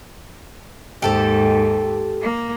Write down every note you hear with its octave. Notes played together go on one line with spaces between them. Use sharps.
D#2 G#2 G4 A4 C5
A#3